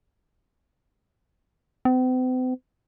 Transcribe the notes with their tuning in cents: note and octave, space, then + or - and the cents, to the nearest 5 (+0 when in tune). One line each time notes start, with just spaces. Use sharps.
C4 -45